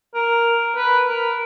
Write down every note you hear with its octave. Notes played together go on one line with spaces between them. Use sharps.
A#4
B4
A#4